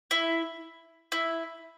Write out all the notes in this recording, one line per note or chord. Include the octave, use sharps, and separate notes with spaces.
E4
E4